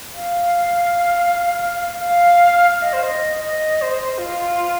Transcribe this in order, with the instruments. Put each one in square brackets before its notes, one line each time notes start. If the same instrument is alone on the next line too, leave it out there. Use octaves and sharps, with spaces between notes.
[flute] F5
F5
F5
D#5
C5
D#5
D#5
C5
F4